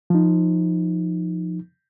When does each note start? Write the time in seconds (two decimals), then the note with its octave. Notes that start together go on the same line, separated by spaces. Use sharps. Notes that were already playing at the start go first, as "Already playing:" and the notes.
0.10 F3 D#4